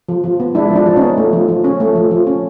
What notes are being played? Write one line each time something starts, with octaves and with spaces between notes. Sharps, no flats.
F3
F3
B3
G#3 D4 E4
F3
D4
F3
B3 C#4 D#4
A3
F3
F3
C#4
A3
F3
F3
C#4